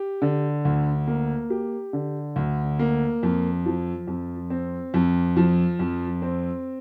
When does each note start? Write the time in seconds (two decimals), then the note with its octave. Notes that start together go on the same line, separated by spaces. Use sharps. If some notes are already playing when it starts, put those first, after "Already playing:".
Already playing: G4
0.22 D3
0.65 D2
1.08 A#3
1.50 G4
1.93 D3
2.36 D2
2.79 A#3
3.23 F2
3.66 F3
4.07 F2
4.50 C4
4.94 F2
5.37 F3
5.79 F2
6.22 C4